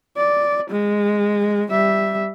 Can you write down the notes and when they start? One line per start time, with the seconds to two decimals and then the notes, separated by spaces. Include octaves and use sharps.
0.17 D5
0.70 G#3
1.71 G3 E5